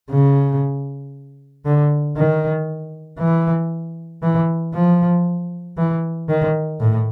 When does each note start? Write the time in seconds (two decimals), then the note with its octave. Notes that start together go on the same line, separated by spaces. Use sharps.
0.11 C#3
1.65 D3
2.17 D#3
3.19 E3
4.22 E3
4.75 F3
5.78 E3
6.29 D#3
6.80 A2